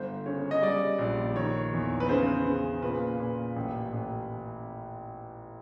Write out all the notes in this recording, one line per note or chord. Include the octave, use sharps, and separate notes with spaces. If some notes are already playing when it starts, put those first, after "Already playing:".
Already playing: G1 C5
C#3 C#5
D#5
G3 D5
A#1
D#3 C#5
E2
B4
C#3 C5
C#3
A#2 B4
A#2
A1
A1